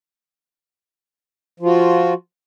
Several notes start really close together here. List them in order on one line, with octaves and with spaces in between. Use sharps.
F3 F4 F#4